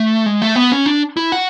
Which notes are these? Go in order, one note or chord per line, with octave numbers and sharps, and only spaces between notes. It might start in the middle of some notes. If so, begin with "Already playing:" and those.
Already playing: A3
G#3
A3
B3
C#4
D4
E4
F#4